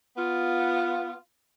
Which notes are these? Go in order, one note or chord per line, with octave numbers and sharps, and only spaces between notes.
B3 F4